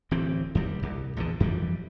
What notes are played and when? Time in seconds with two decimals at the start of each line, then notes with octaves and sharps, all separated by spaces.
0.11 D1 E3 C4
0.55 D#2 G3
0.83 C2
1.17 A#1 E2 D3
1.40 F2 E3 G3